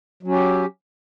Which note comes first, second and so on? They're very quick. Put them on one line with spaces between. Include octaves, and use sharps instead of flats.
F#3 C#4 G4